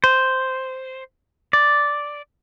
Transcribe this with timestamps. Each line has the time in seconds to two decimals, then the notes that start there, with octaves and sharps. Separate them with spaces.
0.04 C5
1.53 D5